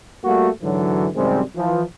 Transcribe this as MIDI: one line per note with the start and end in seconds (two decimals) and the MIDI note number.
0.24 0.49 55
0.24 0.49 57
0.24 0.49 58
0.24 0.49 66
0.62 1.08 44
0.62 1.08 50
0.62 1.08 52
0.62 1.08 54
1.14 1.42 42
1.14 1.42 48
1.14 1.42 51
1.14 1.42 55
1.14 1.42 56
1.14 1.42 60
1.56 1.82 52
1.56 1.82 53